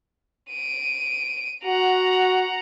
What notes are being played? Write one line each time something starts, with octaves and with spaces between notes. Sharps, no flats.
D7 D#7
F#4 F#5 A#5